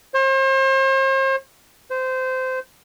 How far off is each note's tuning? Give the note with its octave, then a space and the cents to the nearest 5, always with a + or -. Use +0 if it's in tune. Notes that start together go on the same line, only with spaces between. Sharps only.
C5 +40
C5 -20